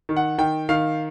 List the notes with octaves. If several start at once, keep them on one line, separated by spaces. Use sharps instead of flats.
D#3
F#5
D#3 G5
D#3 F5